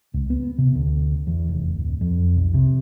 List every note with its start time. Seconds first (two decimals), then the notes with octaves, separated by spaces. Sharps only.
0.14 C#2
0.30 B3
0.58 C3
0.75 D2
1.27 E2
1.49 F1
1.74 D1
2.01 F2
2.36 B1
2.54 C3